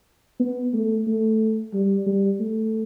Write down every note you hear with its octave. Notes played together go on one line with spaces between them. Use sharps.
B3
A3
A3
G3
G3
A3